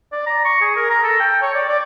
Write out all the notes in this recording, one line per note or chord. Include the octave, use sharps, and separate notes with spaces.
D5
A#5
C#6
G#4
A#4
A#5
A4
G5
C#5
D5
D5